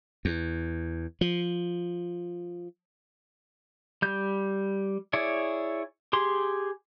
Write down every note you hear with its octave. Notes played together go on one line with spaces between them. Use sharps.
E2
F3
G3 G6
E4 G#4 C#5 D5
G4 G#4 C6